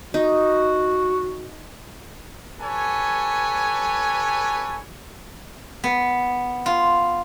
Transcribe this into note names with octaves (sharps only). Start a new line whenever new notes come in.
D#4 F#4
G4 A4 B4 C#5 G#5
B3
F4